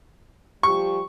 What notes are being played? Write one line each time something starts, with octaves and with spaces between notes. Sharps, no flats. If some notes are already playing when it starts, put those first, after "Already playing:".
F3 G3 G4 C#6